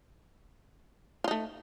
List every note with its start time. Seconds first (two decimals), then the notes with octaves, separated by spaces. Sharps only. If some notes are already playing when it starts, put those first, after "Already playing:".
1.24 F4
1.28 D#4
1.31 A3